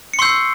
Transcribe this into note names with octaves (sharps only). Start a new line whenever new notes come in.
C#7
C6 C#6 E6 G6 C7